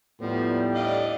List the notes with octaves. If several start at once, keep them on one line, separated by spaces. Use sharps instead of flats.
D#2 A2 F3 G3 B3
A3 D4 E4 D5 D#5 F5